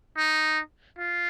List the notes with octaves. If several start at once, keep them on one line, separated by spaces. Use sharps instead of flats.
D#4
F4